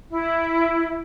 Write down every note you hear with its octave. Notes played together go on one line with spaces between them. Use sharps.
E4